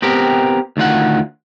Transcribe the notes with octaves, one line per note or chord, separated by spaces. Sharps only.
B3 C4 G4 A#4
D2 D#3 F4 F#5